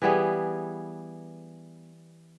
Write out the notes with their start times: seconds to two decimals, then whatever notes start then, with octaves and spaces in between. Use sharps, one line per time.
0.02 E3 G3 B3 G#4